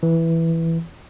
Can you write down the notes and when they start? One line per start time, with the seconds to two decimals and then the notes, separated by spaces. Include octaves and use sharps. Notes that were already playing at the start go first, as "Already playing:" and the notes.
0.03 E3